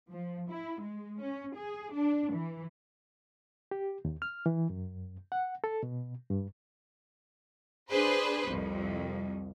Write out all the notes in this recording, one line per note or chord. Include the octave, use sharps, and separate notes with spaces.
F3
E4
G#3
C#4
G#4
D4
E3
G4
D#2
F6
E3
F#2
F#5
A4
B2
G2
D4 G#4 B4 C5
C2 F2